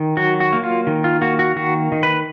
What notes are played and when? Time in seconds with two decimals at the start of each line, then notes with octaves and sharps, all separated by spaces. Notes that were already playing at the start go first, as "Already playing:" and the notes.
Already playing: D#3
0.17 F#3 F#4
0.40 F#4
0.53 A#3
0.64 F4
0.87 D#3
1.04 F4
1.22 A#3 F#4
1.39 F#4
1.56 D#3 F#4
1.92 D#3
2.03 B4